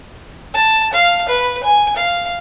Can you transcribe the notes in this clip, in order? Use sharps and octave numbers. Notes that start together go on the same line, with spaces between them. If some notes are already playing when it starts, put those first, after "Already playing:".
A5
F5
B4
G#5
F5